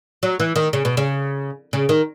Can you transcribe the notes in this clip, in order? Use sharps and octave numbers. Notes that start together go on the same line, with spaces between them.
F#3
E3
D#3
C#3
B2
C#3
C#3
D#3